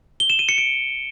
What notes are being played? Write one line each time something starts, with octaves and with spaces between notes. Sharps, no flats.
G7
E7
D#7
C#7
D7